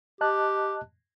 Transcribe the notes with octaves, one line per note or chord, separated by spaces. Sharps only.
G4 D#5 A5 F#6